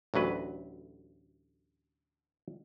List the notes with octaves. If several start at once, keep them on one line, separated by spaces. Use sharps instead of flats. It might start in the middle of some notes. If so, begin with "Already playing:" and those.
A1 D2 F#3 B4